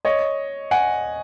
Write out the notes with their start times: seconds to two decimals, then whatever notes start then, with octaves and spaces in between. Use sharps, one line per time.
0.05 C#5 D#5
0.71 F#5 G#5